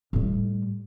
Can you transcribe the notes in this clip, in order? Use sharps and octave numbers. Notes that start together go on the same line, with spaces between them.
A2 G3